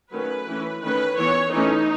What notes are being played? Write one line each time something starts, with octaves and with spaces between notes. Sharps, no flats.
D#3 F#3 A3 C#4 B4
E3 A3 C#4
D#3 A3 C#4 B4
E3 B3 C#5
E3 A3 C#4 D#4